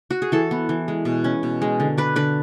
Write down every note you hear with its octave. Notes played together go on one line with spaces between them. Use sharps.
F#4
G#4
E3 A4
B3
E3
G#3
B2
C#4
B2
G#3
D3
D4 B4
D3 B4